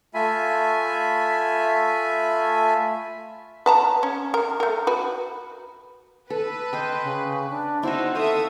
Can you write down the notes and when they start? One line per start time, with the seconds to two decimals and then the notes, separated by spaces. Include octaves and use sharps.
0.14 A3 F4 E5 G#5 B5
3.66 B4 A5 A#5
4.03 C#4
4.34 A#4
4.60 A3 A#4
4.87 F#4 B4
6.30 A4 B4
6.73 C5 D#5 G5
7.04 C#3
7.50 D4
7.83 C4 D#4 E4 F#4 C5 E5
8.15 A4 C#5 E5 F5 D#6